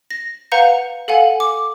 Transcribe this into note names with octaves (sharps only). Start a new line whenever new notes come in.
A#6
B4 F5 F#5 A#5 G6 C#7
A4 F5 F#5 G#5
D6